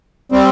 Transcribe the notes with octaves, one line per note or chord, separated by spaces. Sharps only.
G3 C4